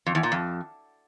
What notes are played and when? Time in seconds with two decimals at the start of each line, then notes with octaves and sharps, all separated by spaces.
0.06 F2
0.15 E2
0.23 A#2
0.32 F2